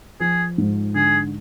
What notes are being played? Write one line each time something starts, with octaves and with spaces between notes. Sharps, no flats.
F3 G#4
G#2
D3 G#4